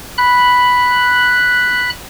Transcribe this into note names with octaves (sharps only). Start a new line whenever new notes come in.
B5 F#6